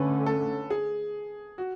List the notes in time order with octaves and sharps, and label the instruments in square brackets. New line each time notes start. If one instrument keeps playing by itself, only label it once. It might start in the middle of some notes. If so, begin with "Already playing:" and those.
Already playing: [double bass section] D3 A3 C#4 [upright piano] B4
[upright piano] A4
G#4
F#4